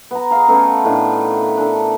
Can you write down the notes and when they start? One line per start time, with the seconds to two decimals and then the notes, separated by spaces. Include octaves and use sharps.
0.11 B3 A#5
0.31 G#4 D#5 F5 A#5
0.48 A3 B3 C#4 A4
0.84 A2 D#3 D4
1.42 B5
1.58 D4 A4